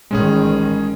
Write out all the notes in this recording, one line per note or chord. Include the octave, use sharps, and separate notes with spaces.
A1 D#3 G#3 C#4 G#4